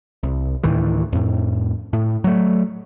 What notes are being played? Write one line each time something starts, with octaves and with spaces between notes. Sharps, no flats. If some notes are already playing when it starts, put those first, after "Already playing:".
C2
D2 A2 D#3 E3
F2 A2
A2
F#3 A3